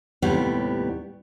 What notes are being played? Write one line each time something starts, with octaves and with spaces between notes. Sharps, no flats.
D#2 A2 C3 G3 B3